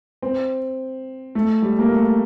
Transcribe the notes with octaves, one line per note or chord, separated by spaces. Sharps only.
C4
A3
G3
A#3
A3